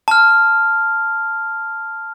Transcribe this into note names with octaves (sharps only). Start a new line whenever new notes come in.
A5 F6